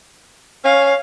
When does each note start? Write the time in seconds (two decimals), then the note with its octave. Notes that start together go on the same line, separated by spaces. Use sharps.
0.64 C#4 F5